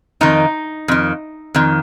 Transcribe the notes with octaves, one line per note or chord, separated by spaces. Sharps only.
F2 D#3 D#4
F2 D#3
F2 D#3